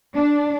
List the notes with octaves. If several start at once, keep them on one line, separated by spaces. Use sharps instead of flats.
D4